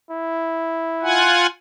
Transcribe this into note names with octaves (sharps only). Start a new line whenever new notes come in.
E4
F4 F#5 G#5